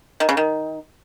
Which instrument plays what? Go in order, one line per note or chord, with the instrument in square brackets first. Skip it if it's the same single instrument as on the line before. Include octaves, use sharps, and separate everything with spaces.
[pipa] D#3
C#3
D#3